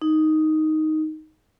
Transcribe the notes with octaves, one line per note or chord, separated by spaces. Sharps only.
D#4